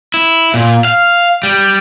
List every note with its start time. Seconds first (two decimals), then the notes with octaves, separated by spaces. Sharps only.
0.14 E4
0.54 A#2
0.85 F5
1.43 G3